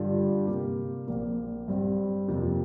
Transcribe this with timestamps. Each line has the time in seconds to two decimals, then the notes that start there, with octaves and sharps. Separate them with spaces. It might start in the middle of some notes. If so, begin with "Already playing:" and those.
Already playing: G2 D3 G3 D4 F4
0.47 C3 A#3 G4
1.08 A#1 A#2 A#3
1.68 G2 G3 C4
2.28 F2 C3 F3 A#3